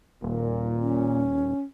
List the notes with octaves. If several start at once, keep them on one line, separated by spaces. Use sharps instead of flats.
D#1 A#2
C#4